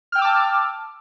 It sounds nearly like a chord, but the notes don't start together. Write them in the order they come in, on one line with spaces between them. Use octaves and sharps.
F6 G5 E6 D6 A5